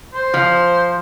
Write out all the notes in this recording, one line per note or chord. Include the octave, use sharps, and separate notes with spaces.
C5
F3